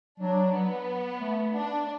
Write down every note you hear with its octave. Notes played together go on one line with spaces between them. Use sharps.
F#3 D4
B3
A3
D4